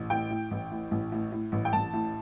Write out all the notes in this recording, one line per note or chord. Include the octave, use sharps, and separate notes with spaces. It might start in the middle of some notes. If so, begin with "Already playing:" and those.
Already playing: A1
A2 G5
A2
A1
A2
A1
A2
A2
A1
G5
A1 A5
A2